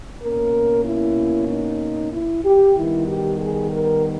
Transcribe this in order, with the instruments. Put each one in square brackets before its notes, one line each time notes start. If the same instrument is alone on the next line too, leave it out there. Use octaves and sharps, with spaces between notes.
[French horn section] B2 A#3 C#4 A#4
E4
D#4
E4
G4
D#3 G3 B3 E4
G4
G#4
A#4